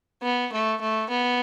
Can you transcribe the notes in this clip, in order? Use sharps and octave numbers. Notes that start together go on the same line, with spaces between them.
B3
A3
A3
B3